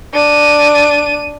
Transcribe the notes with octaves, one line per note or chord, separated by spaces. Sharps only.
D4 D#7